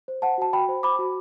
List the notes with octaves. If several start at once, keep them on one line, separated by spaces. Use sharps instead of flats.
C5
C5 F#5 A5
F#4 A5
F#4 G5 B5
C5
C5 B5 D6
F#4